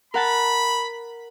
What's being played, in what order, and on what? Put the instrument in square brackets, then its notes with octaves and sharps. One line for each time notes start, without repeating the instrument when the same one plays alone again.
[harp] A#4 F#5 A5 [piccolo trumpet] B5